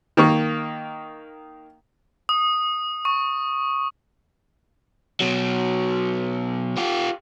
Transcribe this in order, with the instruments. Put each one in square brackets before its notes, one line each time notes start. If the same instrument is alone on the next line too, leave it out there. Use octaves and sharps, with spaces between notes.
[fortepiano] D#3 A#3 C#6
[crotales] D#6
C#6
[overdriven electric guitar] B2 F#3
F4 G4